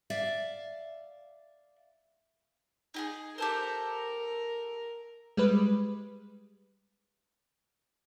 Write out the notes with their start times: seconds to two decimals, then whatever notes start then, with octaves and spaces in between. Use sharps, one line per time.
0.10 D5 E5 F5
2.94 D#4 G4 G#4
3.38 G4 A4 A#4 C5
5.37 G3 G#3 B4